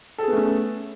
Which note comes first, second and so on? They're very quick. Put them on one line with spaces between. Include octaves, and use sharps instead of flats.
A4 G#4 B3 A3 C#4